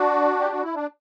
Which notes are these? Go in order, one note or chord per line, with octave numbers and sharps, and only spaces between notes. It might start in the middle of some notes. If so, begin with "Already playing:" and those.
Already playing: D4 F#4
G4
F#4
E4
D4